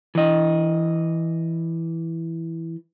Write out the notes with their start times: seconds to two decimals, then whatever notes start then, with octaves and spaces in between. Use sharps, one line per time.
0.15 E3 D#5